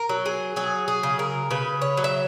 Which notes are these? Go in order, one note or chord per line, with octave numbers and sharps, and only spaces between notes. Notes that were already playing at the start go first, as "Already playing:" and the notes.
Already playing: A#4
F#3
G#4
F#3 G#4
G#4
C#3
A#4
C#3 B4
C#5
F#3
E5